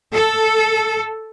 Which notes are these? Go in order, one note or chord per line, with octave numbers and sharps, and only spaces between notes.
A4